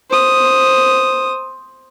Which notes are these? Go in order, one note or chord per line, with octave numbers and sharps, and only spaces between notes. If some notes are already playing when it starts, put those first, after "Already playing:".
C5 D#6